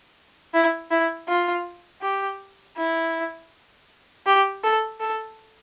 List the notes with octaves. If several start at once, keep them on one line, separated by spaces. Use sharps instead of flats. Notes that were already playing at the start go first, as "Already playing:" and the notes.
E4
E4
F4
G4
E4
G4
A4
A4